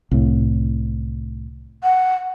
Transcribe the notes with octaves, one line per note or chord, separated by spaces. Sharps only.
C2 A2
F#5